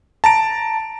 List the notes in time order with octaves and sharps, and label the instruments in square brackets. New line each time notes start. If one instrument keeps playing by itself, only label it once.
[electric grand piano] A5 A#5 D7